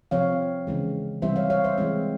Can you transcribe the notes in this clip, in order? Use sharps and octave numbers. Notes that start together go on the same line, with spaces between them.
C3 F3 C4 C#5 F5
C#3 E3 G#3
C3 E3 G3 C4 C5 E5
C#5 F5
C#5 F5
C5 E5
E3 G#3 C4